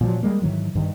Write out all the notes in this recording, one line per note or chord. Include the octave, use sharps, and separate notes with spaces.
A#2 F3 F#3
G3 G#3 A#3
G#2 D#3 E3 F#3
G2 D#3